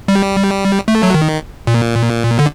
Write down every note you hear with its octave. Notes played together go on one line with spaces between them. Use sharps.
G3
A3
F#3
D#3
A#2
D3